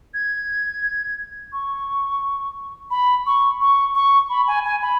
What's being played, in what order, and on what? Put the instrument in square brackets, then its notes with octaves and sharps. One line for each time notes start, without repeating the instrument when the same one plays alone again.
[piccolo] G#6
C#6
B5
C#6
C#6
C#6
B5
G#5
G#5
B5